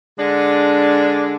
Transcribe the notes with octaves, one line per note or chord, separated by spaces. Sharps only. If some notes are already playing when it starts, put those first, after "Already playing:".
D3 G#3 D4